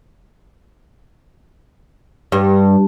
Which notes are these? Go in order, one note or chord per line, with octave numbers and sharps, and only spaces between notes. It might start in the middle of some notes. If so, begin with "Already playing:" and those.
G2